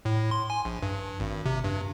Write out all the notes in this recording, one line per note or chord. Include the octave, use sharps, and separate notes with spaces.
A2
C6
G#5
A#1
G2
G#1
C3
G2